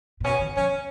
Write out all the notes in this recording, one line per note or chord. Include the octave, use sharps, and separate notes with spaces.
A#2
B2 C#4
D#3
F3 C#4